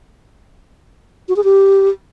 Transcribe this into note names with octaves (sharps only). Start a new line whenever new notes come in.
F#4
G#4
G4